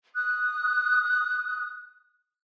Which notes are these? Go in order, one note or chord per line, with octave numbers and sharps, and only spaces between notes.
D#6 F#6